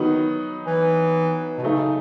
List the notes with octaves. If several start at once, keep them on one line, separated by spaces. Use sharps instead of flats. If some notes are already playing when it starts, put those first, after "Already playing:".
Already playing: D#3 F#3 B3 D#4
E3
B2
C#3 F#3 A3 D#4